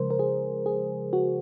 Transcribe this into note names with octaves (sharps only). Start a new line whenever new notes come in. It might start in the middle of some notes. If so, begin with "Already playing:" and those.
Already playing: C#3 F3 G#3 A#4 C5
A#4
G#4
G#4
F#4